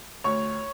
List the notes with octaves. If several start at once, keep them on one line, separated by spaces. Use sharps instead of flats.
D2 C#5 C#6